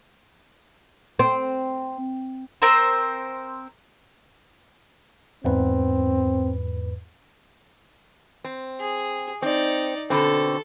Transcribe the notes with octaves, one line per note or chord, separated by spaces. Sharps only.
C4
C4 A#4 C5
E2 G#2 C4 B4
C4
G#4
C4 D#4 D5
B2 D3 C4 A4